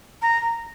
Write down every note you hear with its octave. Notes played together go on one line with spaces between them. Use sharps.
A#5